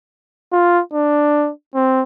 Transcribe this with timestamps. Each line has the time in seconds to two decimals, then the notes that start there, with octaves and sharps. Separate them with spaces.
0.53 F4
0.94 D4
1.75 C4